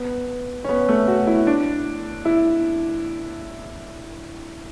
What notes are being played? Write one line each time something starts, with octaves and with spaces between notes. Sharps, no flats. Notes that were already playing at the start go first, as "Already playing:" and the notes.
Already playing: B3
C#4
B3
A3
F#4
E4
D4
E4